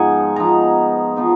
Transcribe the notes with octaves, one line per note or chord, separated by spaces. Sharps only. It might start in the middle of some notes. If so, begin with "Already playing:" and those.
Already playing: G#2 F3 B3 D#4 F#5 G#5
G#2 F3 B3 D#4 A#5
F3 B3 D#4